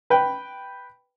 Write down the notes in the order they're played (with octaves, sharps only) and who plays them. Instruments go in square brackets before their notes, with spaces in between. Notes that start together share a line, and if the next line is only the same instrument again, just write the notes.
[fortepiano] B4 G5